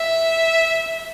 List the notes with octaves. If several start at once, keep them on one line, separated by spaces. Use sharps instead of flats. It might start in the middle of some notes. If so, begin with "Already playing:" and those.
Already playing: E5